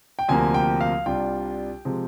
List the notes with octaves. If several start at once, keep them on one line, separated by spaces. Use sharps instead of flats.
G5
D2 C3 F3 A#3 G#5
G5
F5
C2 C3 G3 D4 F4 G5
C3 F3 G#3